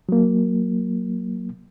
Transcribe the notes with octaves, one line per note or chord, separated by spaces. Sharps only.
F#3 A#3